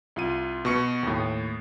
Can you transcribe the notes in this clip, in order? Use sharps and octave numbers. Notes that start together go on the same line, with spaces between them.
C2 F4 D#7
B2 C#6 C#7
D#2 A2